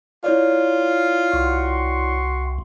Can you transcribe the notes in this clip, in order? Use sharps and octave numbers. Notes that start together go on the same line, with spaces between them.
E4 F4 C#5 D5
C2 F#4 C6 C#6